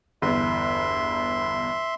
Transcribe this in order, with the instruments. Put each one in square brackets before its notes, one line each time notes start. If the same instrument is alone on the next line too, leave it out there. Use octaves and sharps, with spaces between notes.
[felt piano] G1 E2 [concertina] E5 C6